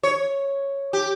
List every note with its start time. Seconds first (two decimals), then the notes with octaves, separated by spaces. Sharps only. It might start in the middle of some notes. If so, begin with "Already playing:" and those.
0.03 C#5
0.93 G4